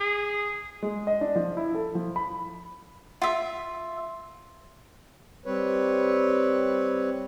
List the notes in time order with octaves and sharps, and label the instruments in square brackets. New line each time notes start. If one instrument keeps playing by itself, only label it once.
[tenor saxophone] G#4
[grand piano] G#3
D#5
D4
F3
E4
A4
F3
B5
[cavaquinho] F4 E5
[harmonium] G3 C4 B4 C#5